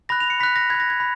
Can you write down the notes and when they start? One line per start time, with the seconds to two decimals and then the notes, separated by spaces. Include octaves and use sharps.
0.09 B5 F#6 A#6
0.20 F7
0.30 C#7
0.40 B5 F#6 B6
0.56 A#6
0.70 B5 G#6
0.75 F#6
0.80 A#6
0.90 G#6
1.00 B5